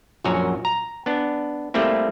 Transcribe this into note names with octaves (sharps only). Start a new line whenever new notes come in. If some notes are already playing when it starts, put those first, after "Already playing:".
A#1 F#2 A#2 F#4 C#5
A#5
B3 D4
G3 A3 A#3 C4 E4